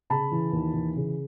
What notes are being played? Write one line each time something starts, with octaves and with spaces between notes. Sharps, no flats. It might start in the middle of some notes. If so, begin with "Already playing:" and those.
C#3 A5 B5
E3
D#2
E3
C#3